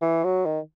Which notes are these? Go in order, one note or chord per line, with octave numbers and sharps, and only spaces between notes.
E3
F#3
D#3